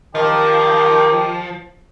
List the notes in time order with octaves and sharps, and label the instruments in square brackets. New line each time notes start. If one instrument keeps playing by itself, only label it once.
[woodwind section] D#3 [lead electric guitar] F3 [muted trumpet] G4